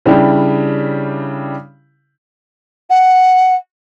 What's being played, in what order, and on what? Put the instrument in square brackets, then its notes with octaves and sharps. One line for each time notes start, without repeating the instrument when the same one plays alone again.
[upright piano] C#3 G3 D4 E4 G4
[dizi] F#5